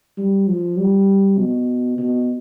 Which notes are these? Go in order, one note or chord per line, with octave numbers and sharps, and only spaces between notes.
G3
F3
G3
B2
B2